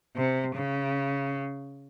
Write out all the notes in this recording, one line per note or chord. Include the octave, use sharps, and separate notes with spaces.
C3
C#3